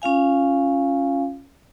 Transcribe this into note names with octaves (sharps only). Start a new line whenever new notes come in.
C#4 F4 F5 G#5